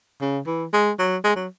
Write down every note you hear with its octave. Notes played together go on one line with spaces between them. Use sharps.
C#3
E3
G#3
F#3
G#3
F#3